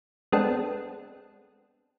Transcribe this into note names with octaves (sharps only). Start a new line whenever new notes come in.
G#3 B3 C4 D4 A4